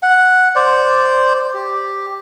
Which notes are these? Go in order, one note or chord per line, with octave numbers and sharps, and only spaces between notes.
F#5
C5 D5
G4